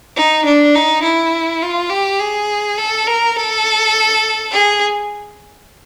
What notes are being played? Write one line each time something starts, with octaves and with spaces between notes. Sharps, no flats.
D#4
D4
D#4
E4
F4
G4
G#4
A4
A#4
A4
G#4